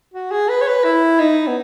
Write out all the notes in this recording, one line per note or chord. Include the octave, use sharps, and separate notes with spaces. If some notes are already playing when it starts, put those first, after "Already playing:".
F#4
G#4
B4
C#5
B4
E4
D#4
B3